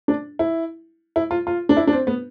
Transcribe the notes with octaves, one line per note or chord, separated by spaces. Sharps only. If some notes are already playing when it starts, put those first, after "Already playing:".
D4
E4
E4
F4
F4
D4
E4
D4
C4
B3